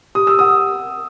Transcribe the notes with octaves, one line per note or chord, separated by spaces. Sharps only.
G4 D#6
E6
F#5 D#6